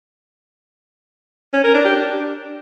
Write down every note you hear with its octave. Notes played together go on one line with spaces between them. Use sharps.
C#4
A#4
D4
G4
D4